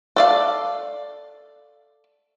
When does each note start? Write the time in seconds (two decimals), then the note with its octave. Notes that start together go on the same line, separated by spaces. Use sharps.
0.16 A4 D5 F5